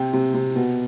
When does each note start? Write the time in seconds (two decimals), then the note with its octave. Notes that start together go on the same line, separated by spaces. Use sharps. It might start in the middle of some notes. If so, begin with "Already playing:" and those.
Already playing: C3 G5
0.13 C3
0.34 C3
0.56 B2